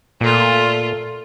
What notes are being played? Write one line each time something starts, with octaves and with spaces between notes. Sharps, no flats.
A#2 A3 F4